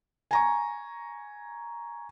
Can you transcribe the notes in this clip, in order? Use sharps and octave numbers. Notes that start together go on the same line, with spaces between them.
G#5 A#5 C#6